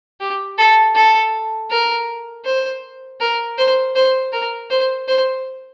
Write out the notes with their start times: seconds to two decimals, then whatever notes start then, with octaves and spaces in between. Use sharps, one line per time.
0.20 G4
0.58 A4
0.95 A4
1.71 A#4
2.45 C5
3.20 A#4
3.58 C5
3.96 C5
4.33 A#4
4.70 C5
5.08 C5